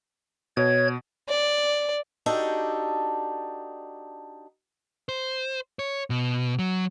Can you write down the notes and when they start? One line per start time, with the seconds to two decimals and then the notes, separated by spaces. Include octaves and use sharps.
0.57 B2 C#5 G#6
1.28 D5
2.26 D4 D#4 F#4 G4 A4
5.09 C5
5.79 C#5
6.10 B2
6.59 F#3